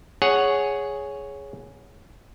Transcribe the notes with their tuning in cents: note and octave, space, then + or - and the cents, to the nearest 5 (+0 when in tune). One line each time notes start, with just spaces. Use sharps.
G#4 +0 C#5 +0 F#5 +0